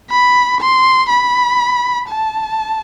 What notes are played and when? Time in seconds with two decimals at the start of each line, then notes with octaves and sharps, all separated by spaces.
0.10 B5
0.61 C6
1.10 B5
2.08 A5